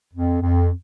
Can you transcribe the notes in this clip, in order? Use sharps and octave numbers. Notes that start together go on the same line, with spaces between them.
F2
F2